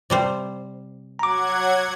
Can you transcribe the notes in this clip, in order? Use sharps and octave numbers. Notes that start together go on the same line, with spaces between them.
C3 G3 C5
F#3 F#5 A#5 D6 G#6